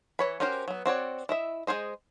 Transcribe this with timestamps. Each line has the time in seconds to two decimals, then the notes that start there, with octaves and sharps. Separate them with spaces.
0.19 E3 C#5 B5
0.40 C#4 F#4 G4 A#4 C5
0.68 F#3 B3
0.86 C4 F#4 C#5 D5
1.29 E4 D#5 E5
1.67 G#3 E4 G#4 C5 D#5